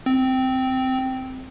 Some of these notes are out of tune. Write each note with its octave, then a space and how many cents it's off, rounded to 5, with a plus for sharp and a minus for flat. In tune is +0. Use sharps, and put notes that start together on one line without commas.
C4 -10